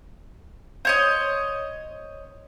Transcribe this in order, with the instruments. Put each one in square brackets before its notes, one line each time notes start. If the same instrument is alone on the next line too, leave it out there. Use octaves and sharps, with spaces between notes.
[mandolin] C5 C#5 D#5